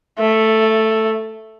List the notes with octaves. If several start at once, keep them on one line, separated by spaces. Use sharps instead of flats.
A3